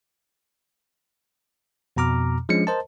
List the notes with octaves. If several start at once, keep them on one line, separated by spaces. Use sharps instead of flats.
F2 B2 A#5 D6 F6
F3 G#3 C#4 D4 C#7
A#4 C5 D#5 A5